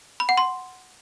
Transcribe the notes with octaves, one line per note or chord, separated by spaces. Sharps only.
B5
F#5
C6